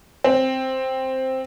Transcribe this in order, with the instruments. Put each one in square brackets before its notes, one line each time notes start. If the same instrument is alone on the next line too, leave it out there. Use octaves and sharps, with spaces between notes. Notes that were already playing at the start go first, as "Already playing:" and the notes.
[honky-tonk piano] C4